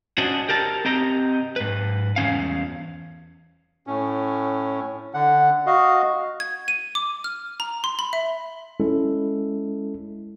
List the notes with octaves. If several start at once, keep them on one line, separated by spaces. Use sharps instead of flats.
C#4 D4 F#4 C5 D#5
G4 A#4 A5
C4 G4 D#5 A#5
G#2 B4
E2 F3 C#4 F5
A2 C#4
D3 F#5
F#4 D#5 F5
G#6
D#7
D6
F6
A#5
C6
B5
E5
G#3 C#4 E4 A4